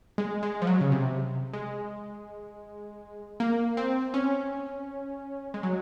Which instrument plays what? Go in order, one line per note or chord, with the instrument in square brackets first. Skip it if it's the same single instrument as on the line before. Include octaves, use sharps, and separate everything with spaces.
[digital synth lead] G#3
G#3
F3
F#3
C#3
C3
G#3
A#3
C4
C#4
G#3
F#3